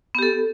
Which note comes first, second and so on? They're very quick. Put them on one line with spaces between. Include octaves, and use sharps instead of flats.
B3 G4 A4